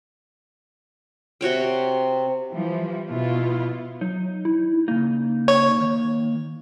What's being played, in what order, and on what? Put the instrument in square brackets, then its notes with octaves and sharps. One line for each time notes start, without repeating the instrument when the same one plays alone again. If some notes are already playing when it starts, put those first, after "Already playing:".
[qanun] C3 F#4 C#5 G5
[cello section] E3 F3 G3
B2 B3 E4 F4
[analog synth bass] F#3 [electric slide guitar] D#4
[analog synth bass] E4
[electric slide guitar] C#3 D#4 [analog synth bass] A#3
[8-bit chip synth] C#5
[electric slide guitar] D#3